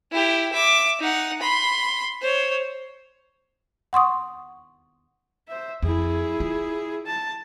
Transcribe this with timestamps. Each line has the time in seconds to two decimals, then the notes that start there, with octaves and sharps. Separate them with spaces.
0.12 E4 G4
0.53 E5 D6
0.99 D#4 F#5
1.42 B5 C6
2.22 C5 C#5
3.93 F#5 C6 C#6 D#6
5.48 C5 E5
5.83 F2 E4 G#4
6.40 F4
7.06 A5